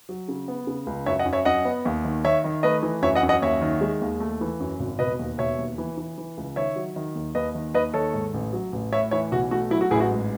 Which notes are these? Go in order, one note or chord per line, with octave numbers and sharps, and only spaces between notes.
F#3
C#3
B3
C#3
C#2
F#2 C#5 E5
D#5 F#5
F#2
C#5 E5
F#2 D#5 F#5
B3
D#2
D#3
D#3 C#5 E5
D#3
A3 B4 D#5
E3
F#2 C#5 E5
D#5 F#5
F#2
D#5 F#5
D#2 C#5 E5
D#3
G#3
D#2
A3
E3
F#2
G#1
E1 B4 D#5
D#2
E1 C#5 E5
D#2
E3
E3
E3
C#2
D#3 C#5 E5
F#3
D#3
D#2
D#2 B4 D#5
D#3
D#2 B4 D#5
D#3 A4 C#5
G#2
A1
F#3
A1
A2 C#5 E5
E3 C#5 E5
B1 F#4
A3 F#4
F#3 E4
F#4
A1 E4 G#4
F#4
G#2